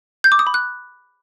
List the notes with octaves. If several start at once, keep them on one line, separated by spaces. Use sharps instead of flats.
G6
D6
D#6
B5
F#6